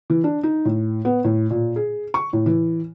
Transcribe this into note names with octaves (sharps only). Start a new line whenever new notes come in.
E3
D4
D#4
A2
B3
A2
A#2
G#4
C#6
A2
E3